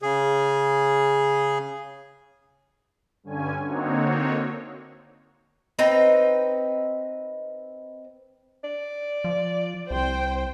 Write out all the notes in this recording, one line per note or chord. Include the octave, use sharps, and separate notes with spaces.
C#3 G#4
G2 D3 C#4 G#5
D3 A#3 C4 D#4 F#4 C#5
C4 D#4 B4 G5
D5
F3
C2 C5 G5